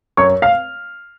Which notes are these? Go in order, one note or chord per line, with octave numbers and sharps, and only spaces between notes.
F#2 C#5 C#6
F5 F6